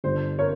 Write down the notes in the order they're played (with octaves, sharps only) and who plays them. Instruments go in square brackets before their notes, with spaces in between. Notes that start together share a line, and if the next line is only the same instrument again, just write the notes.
[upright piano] G1 G2 G3 C5
A#4 C#5